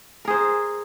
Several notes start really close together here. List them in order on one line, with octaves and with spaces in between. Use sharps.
A#4 G#4 C5